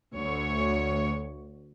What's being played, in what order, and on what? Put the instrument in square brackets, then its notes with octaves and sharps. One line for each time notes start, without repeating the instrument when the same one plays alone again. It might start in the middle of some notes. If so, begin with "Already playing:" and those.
[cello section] D2 C#5